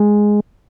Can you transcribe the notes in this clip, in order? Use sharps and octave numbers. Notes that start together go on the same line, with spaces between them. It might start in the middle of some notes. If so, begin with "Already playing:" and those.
Already playing: G#3